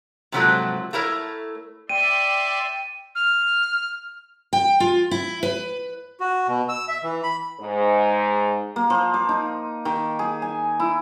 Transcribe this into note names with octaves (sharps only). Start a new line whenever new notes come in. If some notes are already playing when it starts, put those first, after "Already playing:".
G#2 C3 F3 F#3 A3 A#3
A3 E4 A#4 C#5
D5 E5 G5 C6 D#7
F6
G5
F4
E4
B4
F#4
B2
E6
E5
E3
B5
G#2
A#3
F3
D6
D#4
D#3
G#4
G#5
E4